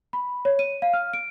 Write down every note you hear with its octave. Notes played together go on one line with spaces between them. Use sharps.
B5
C#5
D#7
F5
F6
D7